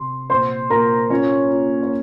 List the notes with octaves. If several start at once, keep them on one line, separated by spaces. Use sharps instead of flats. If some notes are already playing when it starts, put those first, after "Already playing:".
Already playing: C3 C6
A#2 C5 C6
A#2 A#4 A#5
C#4 F4 C#5
F4
C#5